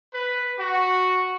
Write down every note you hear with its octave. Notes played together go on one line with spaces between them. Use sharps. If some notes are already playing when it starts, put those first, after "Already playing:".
B4
F#4